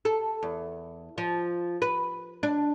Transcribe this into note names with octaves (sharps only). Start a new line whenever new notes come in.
A4
E2
F3
B4
D4